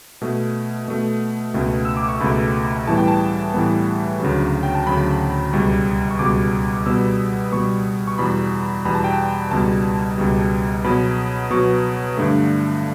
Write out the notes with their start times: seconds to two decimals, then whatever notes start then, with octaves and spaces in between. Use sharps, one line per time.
0.21 B2 A3
0.88 B2 A3
1.54 C#2 B2 A3
1.85 E6
1.97 D6
2.09 C#6
2.20 C#2 B2 A3 B5
2.87 A2 E3 G3 B3 A5
2.97 G5
3.08 A5
3.54 A2 E3 G3 B3
4.20 D2 C#3 F#3
4.63 G5
4.75 A5
4.87 D2 C#3 F#3 B5
5.53 C#2 B2 G3 C#6
6.11 C#6
6.19 C#2 B2 G3 D6
6.86 B2 G3 B3 E6
7.52 B2 G3 B3 C#6
8.07 C#6
8.18 E2 B2 G3 B5
8.85 E2 B2 G3 B5
8.95 A5
9.04 G5
9.13 A5
9.51 C#2 B2 G3 A5
10.18 C#2 B2 G3
10.84 B2 F#3 B3 B5
11.51 B2 F#3 B3 C#6
12.17 G2 D3 A3